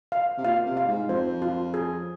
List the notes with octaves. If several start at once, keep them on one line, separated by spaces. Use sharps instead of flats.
F5
C3
A#2 F5
C3
F5
G#2
F2 C5
F4
G#4